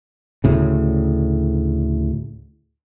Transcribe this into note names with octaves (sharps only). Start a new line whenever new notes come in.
D2 A2 C#3